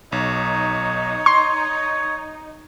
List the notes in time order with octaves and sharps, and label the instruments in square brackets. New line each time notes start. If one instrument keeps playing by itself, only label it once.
[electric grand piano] B1 [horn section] D#4 [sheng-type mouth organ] C#5
[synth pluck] C6 [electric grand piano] C#6